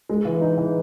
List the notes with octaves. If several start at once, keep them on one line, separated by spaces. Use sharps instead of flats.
G#3
E3
D#4
E3